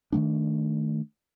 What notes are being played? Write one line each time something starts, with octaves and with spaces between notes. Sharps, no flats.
D#3 E3 A3 D4